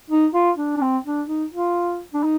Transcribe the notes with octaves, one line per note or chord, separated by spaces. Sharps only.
D#4
F4
D4
D4
C4
D4
D#4
F4
D4
D#4